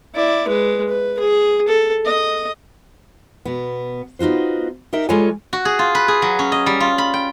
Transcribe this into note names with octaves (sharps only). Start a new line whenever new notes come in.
E4 D5
G#3 B4
B4
G#4
A4
D#5
B2 B3
B3 D#4 F4 F#4 C5
D#4 G4 A#4 E5
G3 G#3 F4 A4 C#5 G#5
F#4
G#4
F4
B4
G#4
F#3
C#4
D#5
G3
F4
B5
G5